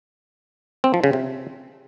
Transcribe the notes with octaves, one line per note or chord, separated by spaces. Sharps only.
C4
F3
C#3
C3